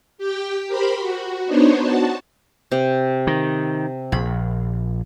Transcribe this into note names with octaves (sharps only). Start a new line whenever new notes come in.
G4 G5
G4 A#4 C5 B5
F#4
B3 D4 D#4 C5 C#5
F#4 A5
C3
D#3
A#1 B5